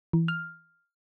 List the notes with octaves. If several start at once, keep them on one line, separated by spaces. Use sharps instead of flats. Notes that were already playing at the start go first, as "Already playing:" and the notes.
E3
F6